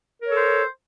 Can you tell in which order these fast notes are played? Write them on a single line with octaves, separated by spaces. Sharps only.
A#4 C#5 A4 C5